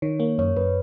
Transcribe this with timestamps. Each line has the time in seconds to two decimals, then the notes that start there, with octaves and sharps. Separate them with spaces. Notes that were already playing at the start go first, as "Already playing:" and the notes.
0.02 D#3 C#5
0.19 A#3 C#5
0.38 F#2 C#5
0.57 F#2 B4